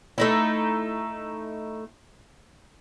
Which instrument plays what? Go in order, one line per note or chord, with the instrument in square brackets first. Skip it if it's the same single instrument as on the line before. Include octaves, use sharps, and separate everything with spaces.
[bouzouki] A3 D#4 E4